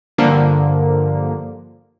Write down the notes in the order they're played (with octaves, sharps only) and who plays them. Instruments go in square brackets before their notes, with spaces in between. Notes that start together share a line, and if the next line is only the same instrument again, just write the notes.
[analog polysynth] G2 D3 F3 A#3